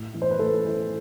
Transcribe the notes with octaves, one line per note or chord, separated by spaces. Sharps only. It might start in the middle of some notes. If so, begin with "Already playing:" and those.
Already playing: A2
E3
C5
B4
A2 A4
E3